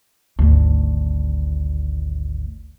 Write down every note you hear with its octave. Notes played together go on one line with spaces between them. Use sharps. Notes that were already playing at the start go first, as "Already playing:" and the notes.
G#1 D2